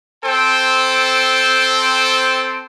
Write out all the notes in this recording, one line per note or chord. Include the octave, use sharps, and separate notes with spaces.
C4 A4 C5 G5